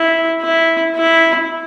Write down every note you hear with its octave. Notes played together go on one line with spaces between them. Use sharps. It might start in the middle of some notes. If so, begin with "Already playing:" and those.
Already playing: E4
E4
E4